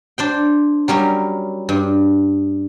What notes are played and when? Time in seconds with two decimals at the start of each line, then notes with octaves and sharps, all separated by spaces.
0.18 D4 C5 G5
0.88 F#3 G3 C#4 A#4
1.69 G2